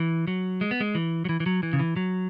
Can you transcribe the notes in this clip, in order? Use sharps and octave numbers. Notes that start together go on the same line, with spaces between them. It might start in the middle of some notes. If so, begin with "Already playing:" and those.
Already playing: E3
F#3
G#3
B3
G#3
E3
F#3
E3
E3
F#3
E3
C#3
E3
F#3